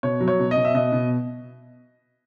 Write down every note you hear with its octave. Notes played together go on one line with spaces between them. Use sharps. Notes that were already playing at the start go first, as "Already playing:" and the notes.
B2 C#5
F#3
C#5
B2
D#5
B2
E5
B2 D#5
B2